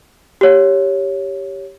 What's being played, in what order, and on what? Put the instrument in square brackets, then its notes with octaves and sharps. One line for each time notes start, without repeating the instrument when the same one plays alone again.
[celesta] G4 C#5